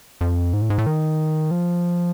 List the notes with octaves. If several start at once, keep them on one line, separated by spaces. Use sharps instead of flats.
F2
G#2
A2
G#2
A2
D#3
F3